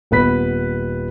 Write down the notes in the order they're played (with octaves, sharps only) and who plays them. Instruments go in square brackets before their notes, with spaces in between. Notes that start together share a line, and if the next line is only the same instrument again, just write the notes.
[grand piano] D#1 B3 B4 B6